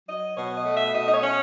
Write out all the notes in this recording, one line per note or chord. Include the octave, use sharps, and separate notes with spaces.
F#3 D#5
B2 C#5
D#5
A3
E5
B2 D#5
D#5
C#5
C#4